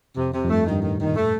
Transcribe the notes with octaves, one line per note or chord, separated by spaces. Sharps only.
F2 C3
C3
F2
G2 A3
D#3
G2
A2 D#3
A#2 D#3
A3